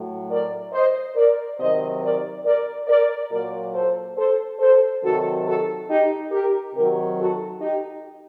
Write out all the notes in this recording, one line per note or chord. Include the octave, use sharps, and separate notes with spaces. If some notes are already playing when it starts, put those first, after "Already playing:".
Already playing: A2 F#3
A#4 D5
C5 D#5
A#4 D5
C3 D#3 F#3 C5 D#5
A#4 D5
A#4 D5
A#4 D5
A#2 F#3 A#4 D5
A4 C5
A4 C5
A4 C5
C3 D#3 F#3 F#4 A4
F#4 A4
D#4 G4
G4 A#4
C3 D#3 F#3 G4 A#4
F#4 A4
D#4 G4